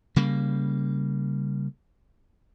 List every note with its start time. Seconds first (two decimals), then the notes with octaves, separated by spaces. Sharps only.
0.16 C#3 G3 A#3